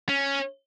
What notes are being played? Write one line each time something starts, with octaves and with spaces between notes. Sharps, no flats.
C#4